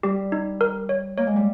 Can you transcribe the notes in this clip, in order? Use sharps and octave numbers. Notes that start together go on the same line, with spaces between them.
G3 G4
D#4
A#4
C#5
A#3 C#5
G#3
G3